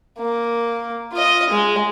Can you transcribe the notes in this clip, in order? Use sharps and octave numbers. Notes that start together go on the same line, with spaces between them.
A#3
F4 D#5
G#3